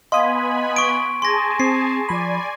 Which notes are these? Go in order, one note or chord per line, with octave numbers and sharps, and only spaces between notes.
B3 D#5 F5 G#5 B5 C6 D#6
C#6 D7
G#4 G#5 A5 C6 A#6
C4 C7
F3 D5 G#5 B5